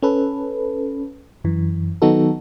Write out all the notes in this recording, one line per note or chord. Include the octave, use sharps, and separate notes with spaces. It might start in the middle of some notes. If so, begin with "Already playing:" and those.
C#4 A4 B4
F#2 E3
D#3 F#3 B3 D#4 F#4 A4